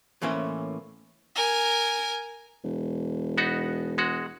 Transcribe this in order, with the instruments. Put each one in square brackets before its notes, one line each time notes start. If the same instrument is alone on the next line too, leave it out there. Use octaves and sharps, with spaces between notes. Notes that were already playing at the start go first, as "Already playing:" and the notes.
[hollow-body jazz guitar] A2 E3 A#3 C#4 C5 E5
[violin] A#4 G#5
[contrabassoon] E1
[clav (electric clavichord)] B3 D#4 F#4
G#3 F#4